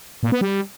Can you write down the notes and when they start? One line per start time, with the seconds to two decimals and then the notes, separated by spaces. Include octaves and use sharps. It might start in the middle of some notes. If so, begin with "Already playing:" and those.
0.23 A#2
0.32 B3
0.41 G3